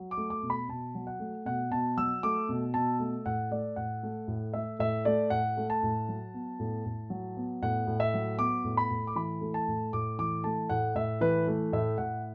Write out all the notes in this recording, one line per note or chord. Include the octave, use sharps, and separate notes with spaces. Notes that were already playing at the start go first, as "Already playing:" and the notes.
Already playing: F#3
D6
A3
D6
B2
B5
B2 A5
F#3
F#5
A3
B2 F#5
B2 A5
F#3 E6
A3 D6
B2
B2 A5
A3
A2 F#5
A3 D5
A2 F#5
A3
A2
A3 E5
A2 E5
A3 D5
A2 F#5
A3
A5
A2
F#3
B3
A2
A2
F#3
B3
A2 F#5
A2
E5
F#3
B3 D6
A2
B5
A2
D6
E3 B5
A3
A5
A2
A2 D6
E3 D6
A3 A5
A2 F#5
A2 E5
E3 B4
A3
A2 E5
A2 F#5